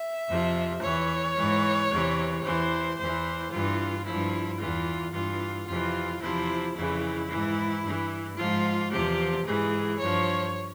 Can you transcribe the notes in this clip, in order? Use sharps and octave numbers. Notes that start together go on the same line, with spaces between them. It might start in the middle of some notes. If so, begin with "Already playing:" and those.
Already playing: E5
F2 C3 F3
E2 E3 C#5
G#2 E3
E2 C3 E3
E2 E3 C5
E2 E3 C5
G2 E3 F4
G2 F3 E4
E2 E3 F4
G2 E3 F4
F2 C3 E3 F4
E2 C3 F3 E4
F2 C#3 E3 E4
G#2 E3
G2 E3
G#2 F3 F4
E2 C3 F3 G4
G#2 E3 G#4
G2 F3 C#5